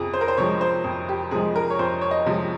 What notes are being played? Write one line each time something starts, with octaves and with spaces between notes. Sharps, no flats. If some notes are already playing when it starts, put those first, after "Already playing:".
Already playing: F2 C3 F3 G#4
C5
A#4
C5
C3 F3 G#3 C#5
C5
F2
G4
C3 F3 G#3 G#4
A#4
C#5
F2 C5
C#5
D#5
C3 F3 G#3